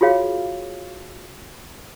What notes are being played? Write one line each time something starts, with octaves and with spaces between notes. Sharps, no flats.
F4 F#4 G#4 C#5 F5